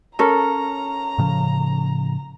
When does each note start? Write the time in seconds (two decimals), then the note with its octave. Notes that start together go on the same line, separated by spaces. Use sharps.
0.19 C#4 A4 A#4 A#5
1.18 A2 C#3 F3